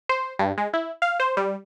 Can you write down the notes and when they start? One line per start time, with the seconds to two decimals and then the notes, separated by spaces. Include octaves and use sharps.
0.09 C5
0.39 G2
0.58 G#3
0.73 E4
1.02 F5
1.20 C5
1.37 G3